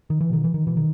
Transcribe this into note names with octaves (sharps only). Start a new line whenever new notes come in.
D#3
E3
B2 D#3
E3
D#3
B2 E3
D#3